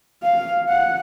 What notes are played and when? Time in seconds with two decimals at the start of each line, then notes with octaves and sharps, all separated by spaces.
0.24 F5
0.69 F#5